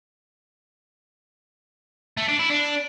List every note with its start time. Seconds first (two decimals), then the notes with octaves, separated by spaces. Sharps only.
2.17 A3
2.28 D4
2.39 E4
2.50 D4